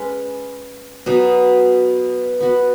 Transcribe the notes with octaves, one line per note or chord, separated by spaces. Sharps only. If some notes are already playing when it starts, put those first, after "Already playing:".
Already playing: G#3 C#4 B4
B2 F#3 B3 D#4
B3 F#4 B4